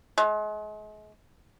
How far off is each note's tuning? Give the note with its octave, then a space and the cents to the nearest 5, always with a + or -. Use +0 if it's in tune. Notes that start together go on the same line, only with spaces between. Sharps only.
G#3 +40